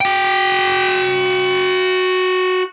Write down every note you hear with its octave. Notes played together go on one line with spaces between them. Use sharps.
F#4 G5